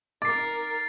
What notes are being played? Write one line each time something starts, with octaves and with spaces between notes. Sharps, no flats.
D#4 A#4 D6 A6 C7